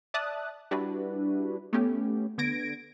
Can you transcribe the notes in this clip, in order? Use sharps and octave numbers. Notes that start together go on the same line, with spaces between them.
D5 E5 A5 D#6 F#6
G3 D4 E4 F#4 B4
A3 B3 C#4 G4
D3 B3 G#6 A#6 D7